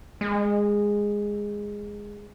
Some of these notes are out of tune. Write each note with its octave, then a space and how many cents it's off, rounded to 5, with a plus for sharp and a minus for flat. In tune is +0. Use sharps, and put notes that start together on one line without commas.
G#3 -10